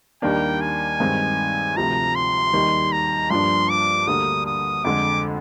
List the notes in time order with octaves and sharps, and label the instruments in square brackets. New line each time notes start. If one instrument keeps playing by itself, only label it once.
[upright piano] D#2 D#3 G3 A#3 D4 [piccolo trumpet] G5
[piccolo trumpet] G#5
[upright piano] G2 D#3 G#3 C4 D#4
[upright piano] D2 C3 F3 [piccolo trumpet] A#5
[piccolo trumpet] C6
[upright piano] D#2 D#3 G3
[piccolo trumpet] A#5
[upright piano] G2 F3 A#3 D4 [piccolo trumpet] C6
[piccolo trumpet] D6
[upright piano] D2 D3 G3 A#3 D4 [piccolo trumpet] D#6
[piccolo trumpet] D#6
[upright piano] F2 D3 G#3 [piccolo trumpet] D6